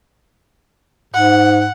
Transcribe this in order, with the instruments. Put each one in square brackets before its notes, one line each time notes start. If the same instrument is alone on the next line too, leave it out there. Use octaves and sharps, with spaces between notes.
[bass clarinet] G#2 [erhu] F#5